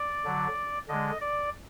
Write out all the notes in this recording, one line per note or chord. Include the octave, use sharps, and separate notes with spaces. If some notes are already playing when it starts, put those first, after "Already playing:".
Already playing: D5
D3 F#3
D3 G#3 D#5
D5